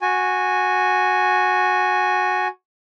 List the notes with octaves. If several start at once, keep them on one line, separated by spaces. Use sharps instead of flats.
F#4 G#5